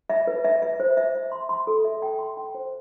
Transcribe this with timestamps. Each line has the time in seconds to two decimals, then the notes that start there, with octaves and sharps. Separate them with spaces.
0.10 E5
0.27 B4
0.44 E5
0.62 E5
0.80 C5
0.97 E5
1.15 E5
1.32 C6
1.49 C6
1.67 A4
1.85 E5
2.02 G5
2.19 C6
2.37 G5
2.55 C5